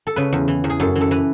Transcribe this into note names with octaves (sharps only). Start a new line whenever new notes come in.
A4
C#3 B4
E2
E3
E2
G#4
F#2 A4
E3
A4
E3 B4